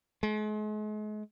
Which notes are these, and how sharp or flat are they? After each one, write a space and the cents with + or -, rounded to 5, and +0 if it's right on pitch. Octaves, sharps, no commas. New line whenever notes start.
G#3 +40